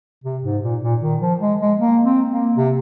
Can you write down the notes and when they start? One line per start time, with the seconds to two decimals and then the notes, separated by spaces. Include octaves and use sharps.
0.24 C3
0.44 G#2
0.63 A#2
0.82 A#2
1.01 D#3
1.21 F3
1.41 G#3
1.60 G#3
1.78 A#3
2.04 C4
2.31 A#3
2.56 C3